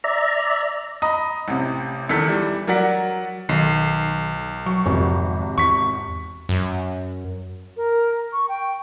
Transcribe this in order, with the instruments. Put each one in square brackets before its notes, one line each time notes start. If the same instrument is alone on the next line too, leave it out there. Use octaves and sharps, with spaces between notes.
[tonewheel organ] D5 E5 A#5
[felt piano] D#5 A#5 B5 D#6
A1 C3
E2 D#3 A4 B6
E3 G3
F#3 A#4 D5 F#5 B6
[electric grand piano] B1 [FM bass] D#3 [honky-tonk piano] C7
[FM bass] F#3 [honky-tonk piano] C#6
[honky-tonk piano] G#1 C3 [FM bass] F2
[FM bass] E2 [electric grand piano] C#6 B6
[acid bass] F#2
[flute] A#4
C#6
G5